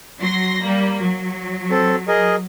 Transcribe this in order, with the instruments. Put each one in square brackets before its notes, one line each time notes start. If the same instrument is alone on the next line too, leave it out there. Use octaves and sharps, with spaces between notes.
[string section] F#3 C6 A#6
G3 A#3
F#3
[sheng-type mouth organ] C4 A4
G#4 A#4 D#5